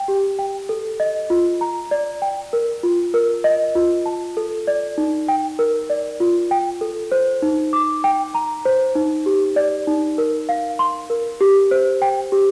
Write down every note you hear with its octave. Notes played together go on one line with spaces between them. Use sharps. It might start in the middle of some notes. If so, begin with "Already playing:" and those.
Already playing: G5
G4
G5
A4
D#5
F4
A#5
D5
G5
A#4
F4
A#4
D#5
F4
A5
A4
D5
D#4
G5
A#4
D5
F4
G5
A4
C5
D#4
D6
G5
A#5
C5
D#4
G4
D5
D#4
A#4
F5
C6
A#4
G4
C5
G5
G4